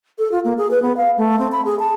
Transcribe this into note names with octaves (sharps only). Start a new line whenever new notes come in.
A4
F4
A#3
G#4
B4
B3
F5
A3
C4
B5
G#4
A5